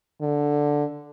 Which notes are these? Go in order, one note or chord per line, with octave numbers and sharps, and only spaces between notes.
D3